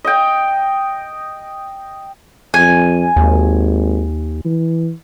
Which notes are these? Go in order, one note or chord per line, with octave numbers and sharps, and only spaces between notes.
D#5 G5
F2 G#5
G#1 D#2
E3